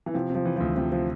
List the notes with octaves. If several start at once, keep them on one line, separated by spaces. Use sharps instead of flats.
E3
C3 F3
C3 F3
E3
D2 F3
C3 F3
F3